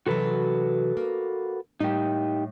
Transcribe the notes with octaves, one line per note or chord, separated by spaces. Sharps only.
C3 E3 F#3 F#4 A4 B4
A#3
A2 G3 D#4 G4